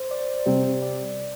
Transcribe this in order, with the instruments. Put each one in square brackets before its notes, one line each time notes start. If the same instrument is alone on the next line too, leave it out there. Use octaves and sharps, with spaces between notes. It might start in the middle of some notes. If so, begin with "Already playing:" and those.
Already playing: [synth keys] C5
D5
[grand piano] C3 G3 C4 G4
[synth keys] D5